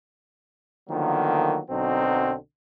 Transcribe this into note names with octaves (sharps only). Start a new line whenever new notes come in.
D3 D#3 F3 F#3 A#3 B3
B1 B2 D3 F#3 C4 D#4